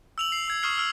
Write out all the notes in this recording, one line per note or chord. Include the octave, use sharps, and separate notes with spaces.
E6 F7 F#7
C7
E6 G#6
C#6 D#6 F6 C7
E6 F6